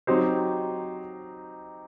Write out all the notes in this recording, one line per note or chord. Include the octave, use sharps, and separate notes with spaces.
F#3 C4 D#4 G4 C5